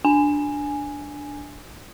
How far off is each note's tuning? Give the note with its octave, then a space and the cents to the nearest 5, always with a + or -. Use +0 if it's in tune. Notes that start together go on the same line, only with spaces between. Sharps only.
D4 +0 G#5 +0